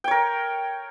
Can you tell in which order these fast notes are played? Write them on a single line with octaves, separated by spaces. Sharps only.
G5 C#5 A#4